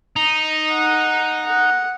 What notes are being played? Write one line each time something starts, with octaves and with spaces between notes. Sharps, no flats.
D#4
F#5
F#5